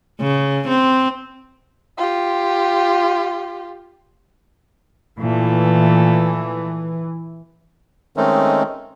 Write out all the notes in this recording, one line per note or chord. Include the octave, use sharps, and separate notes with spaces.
C#3
C4
F4 G4
A#2 E3 A3
D#3 G#3 A3 C4 C#4 D#4